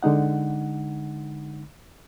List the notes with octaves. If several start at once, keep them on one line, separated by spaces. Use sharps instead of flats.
D3 G#3 D#4 F#5